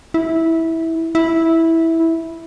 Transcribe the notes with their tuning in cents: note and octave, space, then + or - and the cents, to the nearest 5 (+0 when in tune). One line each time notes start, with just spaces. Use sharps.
E4 -15
E4 -10